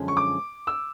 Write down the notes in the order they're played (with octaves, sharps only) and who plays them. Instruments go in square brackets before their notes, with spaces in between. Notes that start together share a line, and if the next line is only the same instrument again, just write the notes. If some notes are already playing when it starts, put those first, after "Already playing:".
Already playing: [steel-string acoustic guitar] F#2 D3 F3 G#3 C#4
[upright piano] C#6
D6
E6